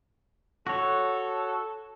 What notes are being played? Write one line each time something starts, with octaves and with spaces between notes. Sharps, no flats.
F#4 A4 C#5